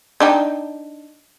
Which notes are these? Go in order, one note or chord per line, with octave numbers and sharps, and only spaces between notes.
D4 D#4 G5